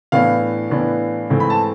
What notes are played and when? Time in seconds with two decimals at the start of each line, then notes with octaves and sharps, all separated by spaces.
0.12 A2 E3 B3 D4 F5
0.70 A2 E3 B3 D4
1.30 G#2 E3 A3 C4
1.40 B5
1.50 A5